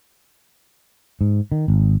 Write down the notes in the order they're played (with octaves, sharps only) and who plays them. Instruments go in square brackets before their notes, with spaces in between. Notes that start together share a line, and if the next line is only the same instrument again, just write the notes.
[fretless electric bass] G#2
D#3
G#1